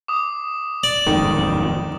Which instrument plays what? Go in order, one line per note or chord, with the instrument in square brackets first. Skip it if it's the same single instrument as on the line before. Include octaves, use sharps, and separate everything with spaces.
[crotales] D6 D#6
[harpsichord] D5
[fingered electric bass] D1 F2 G#2 [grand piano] D#3